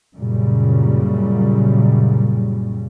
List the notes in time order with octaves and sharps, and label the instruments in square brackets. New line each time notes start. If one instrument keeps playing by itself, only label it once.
[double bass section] F#2 A#2 C#3 G3